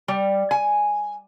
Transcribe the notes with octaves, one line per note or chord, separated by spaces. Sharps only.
G3
G#5